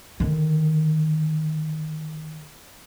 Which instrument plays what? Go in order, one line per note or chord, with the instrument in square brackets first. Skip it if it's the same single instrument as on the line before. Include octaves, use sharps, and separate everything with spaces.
[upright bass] D3 D#3